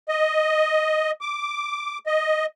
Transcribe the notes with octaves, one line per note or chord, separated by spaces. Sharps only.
D#5
D6
D#5